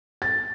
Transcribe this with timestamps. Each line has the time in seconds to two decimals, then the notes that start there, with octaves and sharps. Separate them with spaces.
0.22 A6